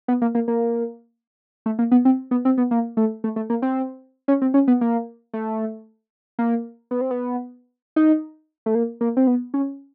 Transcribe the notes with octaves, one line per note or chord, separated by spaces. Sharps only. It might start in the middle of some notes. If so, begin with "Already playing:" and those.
B3
A#3
A#3
A#3
A3
A#3
B3
C4
B3
C4
B3
A#3
A3
A3
A3
A#3
C4
C#4
C4
C#4
B3
A#3
A3
A#3
B3
C4
B3
D#4
A3
A#3
A#3
C4
B3
C#4